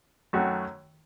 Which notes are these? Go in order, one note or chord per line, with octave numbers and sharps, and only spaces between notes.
F#2 D#3 A3 C#4 F#4